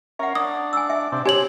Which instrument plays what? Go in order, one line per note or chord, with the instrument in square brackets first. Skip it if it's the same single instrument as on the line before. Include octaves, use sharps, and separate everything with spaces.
[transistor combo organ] C#4 A#4 [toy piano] E5 F#5
[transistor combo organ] D4 [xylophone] D#6
[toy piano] G#5 E6
E5
[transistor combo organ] C3 D4
[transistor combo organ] C4 [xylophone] G4 C#5 F#7 [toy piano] G#5